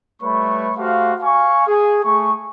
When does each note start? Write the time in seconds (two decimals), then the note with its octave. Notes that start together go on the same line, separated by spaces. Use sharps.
0.22 G3 A3 B4 C#5 B5 C#6
0.77 A3 F#4 G4 C5 F5
1.22 F5 G#5 C#6
1.67 G#4
2.04 A3 G#4 G#5 C#6